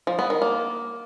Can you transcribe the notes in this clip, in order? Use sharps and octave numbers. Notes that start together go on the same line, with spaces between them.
F3
B3
D#3
A#3